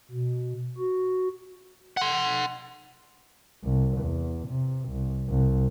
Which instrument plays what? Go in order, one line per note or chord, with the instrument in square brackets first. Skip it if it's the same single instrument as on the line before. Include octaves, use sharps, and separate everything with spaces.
[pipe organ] B2
F#4
[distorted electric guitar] F#5 C6
[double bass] C2
E2
C3
C2
C2